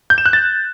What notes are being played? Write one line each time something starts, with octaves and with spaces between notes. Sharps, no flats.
G6
E7
F#6
A6